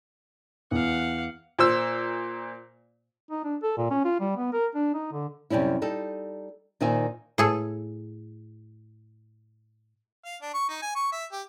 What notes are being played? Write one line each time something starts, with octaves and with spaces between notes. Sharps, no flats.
E2 F5 F#5
A#2 C5 E6
D#4
D4
A4
A#2
C#4
F4
G3
B3
A#4
D4
D#4
D3
F#2 C3 G3 C#4 E4
G3 D#4 A4
A#2 D#3 D#4 C5 E5 G#5
A2 G#4 A4
F5
D4
C#6
D#4
G#5
C#6
E5
G4